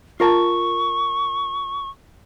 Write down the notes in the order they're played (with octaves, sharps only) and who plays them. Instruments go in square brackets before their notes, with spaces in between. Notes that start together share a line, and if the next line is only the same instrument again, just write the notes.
[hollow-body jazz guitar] F4 A#4 A5 [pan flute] C#6